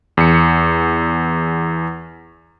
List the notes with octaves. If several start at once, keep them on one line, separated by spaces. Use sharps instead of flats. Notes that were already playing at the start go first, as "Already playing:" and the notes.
E2 C#7